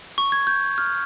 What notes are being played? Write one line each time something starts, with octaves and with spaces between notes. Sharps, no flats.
C#6
G#6
G6
F6